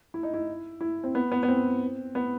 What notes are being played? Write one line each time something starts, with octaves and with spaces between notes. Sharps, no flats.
E4
D#4
E4
E4
C4
B3
B3
B3
C4
B3